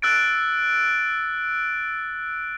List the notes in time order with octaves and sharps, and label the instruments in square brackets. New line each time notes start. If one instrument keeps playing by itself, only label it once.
[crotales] E6 F#6 A6 D7